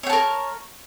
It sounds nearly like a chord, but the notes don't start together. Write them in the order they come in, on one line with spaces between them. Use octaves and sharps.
C#5 G5 A5 A#4